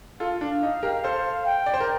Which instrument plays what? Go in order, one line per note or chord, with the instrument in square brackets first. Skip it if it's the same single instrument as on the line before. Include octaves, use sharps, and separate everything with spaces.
[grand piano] F4 A4 [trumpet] F5
[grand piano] D4
D#4
G4 A#4
A4 C5
[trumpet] G5
[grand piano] D5
C5
A#4